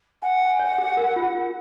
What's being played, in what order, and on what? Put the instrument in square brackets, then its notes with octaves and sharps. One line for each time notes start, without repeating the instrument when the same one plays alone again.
[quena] F#5 [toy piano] G#5
[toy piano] G#5
C#5
G#4
A#4
F4
F4